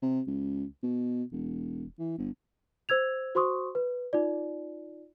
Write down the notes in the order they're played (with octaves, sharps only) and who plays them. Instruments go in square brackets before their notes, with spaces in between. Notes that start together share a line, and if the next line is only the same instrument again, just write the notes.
[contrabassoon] C3
C#2
B2
E1
E3
G1
[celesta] C5 E6 G#6 F7
F#4 C5 C6 C#6 D#6
B4
D#4 F4 D5